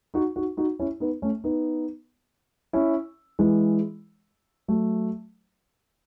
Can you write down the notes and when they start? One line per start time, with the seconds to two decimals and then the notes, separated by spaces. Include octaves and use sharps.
0.14 D#4 F#4
0.36 D#4 F#4
0.57 D#4 F#4
0.79 C#4 E4
1.00 B3 D#4
1.22 A3 C#4
1.44 B3 D#4
2.73 C#4 E4
3.39 E3 G#3
4.68 F#3 A3